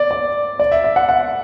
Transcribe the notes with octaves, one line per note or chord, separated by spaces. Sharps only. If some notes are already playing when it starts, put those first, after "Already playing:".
Already playing: D5
D5
D5
E5
E5
F#5
F#5